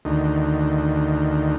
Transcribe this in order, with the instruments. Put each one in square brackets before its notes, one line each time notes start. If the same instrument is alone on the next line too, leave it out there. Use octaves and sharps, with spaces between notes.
[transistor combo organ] D2 D#3